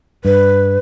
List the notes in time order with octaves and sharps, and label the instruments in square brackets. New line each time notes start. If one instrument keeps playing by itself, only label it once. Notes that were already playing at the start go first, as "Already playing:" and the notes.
[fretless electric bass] G2 [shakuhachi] B4